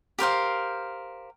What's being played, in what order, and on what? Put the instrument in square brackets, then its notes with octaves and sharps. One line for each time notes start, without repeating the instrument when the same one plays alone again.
[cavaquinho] G4 A#4 C5 F5